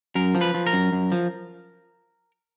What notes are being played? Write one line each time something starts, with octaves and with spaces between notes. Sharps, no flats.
F#2 A#4
F3
B4
F3
A#4
F#2
F#2
F3